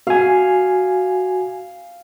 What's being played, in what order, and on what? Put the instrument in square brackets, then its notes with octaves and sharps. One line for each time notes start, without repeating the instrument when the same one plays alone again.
[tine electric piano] F#4 G#5 [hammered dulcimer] F5